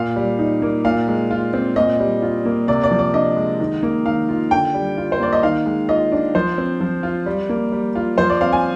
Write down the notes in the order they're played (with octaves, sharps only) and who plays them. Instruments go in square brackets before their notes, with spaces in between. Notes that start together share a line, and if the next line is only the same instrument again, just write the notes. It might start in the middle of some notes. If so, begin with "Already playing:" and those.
Already playing: [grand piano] A#2 F5
G3
D#4
A#3
A#2 F5
G#3
F4
C4
A#2 D#5
G3
F4
A#3
C3 D5
D5
F3
D5
D4 D#5
G#3
D#3
A#3
D#3 F5
F4
D3 G5
G3
F4
C5
A#3 D5
D#5
D#3 F5
G#3
F4 D#5
D4
F3 C5
C4
F3
F4
G3
A#3
G3
F4
F3 C5
D5
C4 F5
G#5